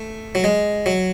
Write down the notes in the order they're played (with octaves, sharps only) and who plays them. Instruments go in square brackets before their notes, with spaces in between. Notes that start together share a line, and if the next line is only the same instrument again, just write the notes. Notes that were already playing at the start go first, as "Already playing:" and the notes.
Already playing: [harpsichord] A3
F#3
G#3
F#3